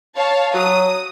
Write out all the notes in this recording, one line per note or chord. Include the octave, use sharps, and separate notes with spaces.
C#5 F5 A5
F#3 D#6